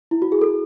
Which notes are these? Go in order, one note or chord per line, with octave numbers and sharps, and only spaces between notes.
E4
F#4
G#4
A4